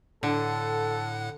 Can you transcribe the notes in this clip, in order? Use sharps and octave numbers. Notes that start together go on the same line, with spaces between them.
A2 D3 A4 F#5 F#6